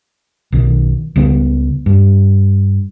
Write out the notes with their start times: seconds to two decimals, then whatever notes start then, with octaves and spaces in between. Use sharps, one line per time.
0.52 B1 B2 D#3
1.16 C#2 C#3 G3 B3
1.86 G2